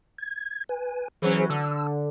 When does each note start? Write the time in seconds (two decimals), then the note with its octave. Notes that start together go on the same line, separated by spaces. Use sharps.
0.18 G#6
0.69 B4 G#5
1.22 E3 F#3 C#4 G#4 C5
1.50 D3 E6